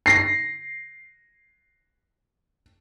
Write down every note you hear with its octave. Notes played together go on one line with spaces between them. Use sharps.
A#6 C7